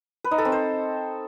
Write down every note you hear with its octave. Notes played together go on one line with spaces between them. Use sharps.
B4
D#4
A4
C4
C5